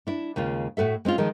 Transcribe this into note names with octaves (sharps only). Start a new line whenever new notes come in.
D4 E4
D#2 C#3 G#3 F4
A2 F#4 A4 E5
G#3 C4 C#4 F4
D#3 F3 G#3